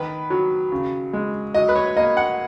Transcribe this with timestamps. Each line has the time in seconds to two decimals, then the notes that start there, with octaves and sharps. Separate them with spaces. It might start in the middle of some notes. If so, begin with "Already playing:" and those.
Already playing: D#3 B4
0.30 F#3
0.72 C#3
1.13 G#3
1.54 F#3 D#5
1.69 B4
1.76 C#5
1.96 A#3 D#5
2.17 F#5